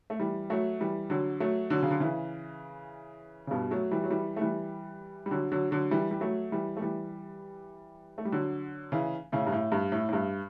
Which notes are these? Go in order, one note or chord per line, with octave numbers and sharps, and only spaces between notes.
A3
E3 G3
F#3 A3
E3 G3
D3 F#3
F#3 A3
D3 F#3
C#3
D3
C#3 E3
C#3
G2 B2
F#3 A3
E3 G3
F#3
E3 G3
A3
E3 G3
G3
D3 F#3
D3 F#3
D3 F#3
E3 G3
G3
F#3 A3
E3 G3
A3
E3 G3
A3
G3
D3 F#3
C#3 E3
A2 C#3
G2
A2
G2
A2
A2
G2